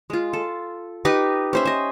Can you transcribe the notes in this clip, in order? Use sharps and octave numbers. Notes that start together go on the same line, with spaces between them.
G#3 F4
A4
D#4 G4 B4 D#5
C#4 C5 E5
D#5 E5